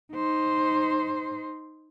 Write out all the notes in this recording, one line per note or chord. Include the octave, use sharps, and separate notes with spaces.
D#4 C5